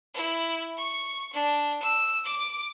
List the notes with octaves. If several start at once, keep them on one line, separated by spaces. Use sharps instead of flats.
E4
C#6
D4
E6
D6